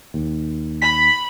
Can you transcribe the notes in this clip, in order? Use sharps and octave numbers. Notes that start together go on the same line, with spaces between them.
D#2
B5 B6